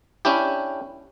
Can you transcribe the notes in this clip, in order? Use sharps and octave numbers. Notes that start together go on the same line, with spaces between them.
C#4 D4 E4 G4